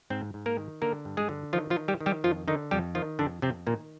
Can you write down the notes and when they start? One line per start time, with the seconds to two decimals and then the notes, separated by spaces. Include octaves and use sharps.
0.10 G#2 C4 C5
0.34 G#2
0.46 A#3 A#4
0.58 D#3
0.82 D3 A#3 A#4
1.05 G2
1.17 G#3 G#4
1.29 D3
1.53 D#3 F3 F4
1.70 F3 F4
1.76 D#3
1.88 G3 G4
2.00 D#3
2.06 G3 G4
2.24 F2 F3 F4
2.48 D3 D#3 D#4
2.71 F2 G3 G4
2.95 D#3 F3 F4
3.19 F2 D3 D4
3.42 F2 C3 C4
3.67 A#2 D#3 A#3